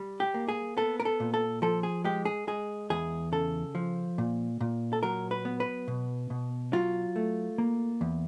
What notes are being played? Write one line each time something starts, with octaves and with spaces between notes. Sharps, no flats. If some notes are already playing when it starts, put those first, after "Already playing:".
Already playing: G3
G4
A#3
G#4
B3 A4
A#4
A4
A#2
A4
F3 A4
G#4
G#3 G4
G#4
G#3 G#4
E2 G#4
C#3 A4
F3
A#2
A#2
A4
F#3 A#4
B4
B3
B4
B2
B2
F#3 F4
A3
A#3
E2